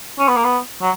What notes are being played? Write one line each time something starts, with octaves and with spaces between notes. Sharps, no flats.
C#4
B3
A#3
B3
F#3